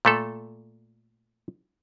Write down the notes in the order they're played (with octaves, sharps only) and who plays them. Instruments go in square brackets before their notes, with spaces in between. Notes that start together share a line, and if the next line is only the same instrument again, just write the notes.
[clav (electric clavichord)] A#2 A3 A4